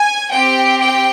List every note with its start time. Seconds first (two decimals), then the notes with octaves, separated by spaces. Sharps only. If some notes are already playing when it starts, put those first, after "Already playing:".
Already playing: G#5
0.32 C4 G4 G5
0.81 G5